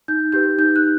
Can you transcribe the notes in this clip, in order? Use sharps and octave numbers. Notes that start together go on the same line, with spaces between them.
D#4 G6
G4 B4 G6
D#4 G6
F#6